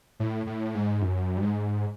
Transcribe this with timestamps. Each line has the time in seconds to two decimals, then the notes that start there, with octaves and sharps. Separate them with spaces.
0.20 A2
0.47 A2
0.75 G#2
1.02 F#2
1.37 G2
1.42 G#2